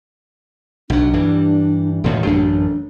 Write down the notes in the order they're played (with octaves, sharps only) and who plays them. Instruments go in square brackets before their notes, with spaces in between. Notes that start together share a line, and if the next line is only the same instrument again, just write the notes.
[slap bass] B1 F#3 [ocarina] D4
[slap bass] G2 E3 G3
E1 A2 D#3
[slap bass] A1 F#2 A3 [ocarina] D4